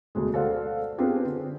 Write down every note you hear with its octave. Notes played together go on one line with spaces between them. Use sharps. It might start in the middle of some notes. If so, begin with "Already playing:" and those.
D2 B2 G#3
A4 C5 D5 F5 F#5
B3 C4 D4 F4 G4 G#4
D3